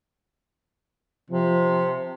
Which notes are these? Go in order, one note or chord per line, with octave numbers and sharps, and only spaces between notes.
C3 F3